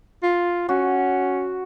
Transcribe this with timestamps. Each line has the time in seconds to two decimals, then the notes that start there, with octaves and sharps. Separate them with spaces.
0.23 F4
0.69 C#4 F#4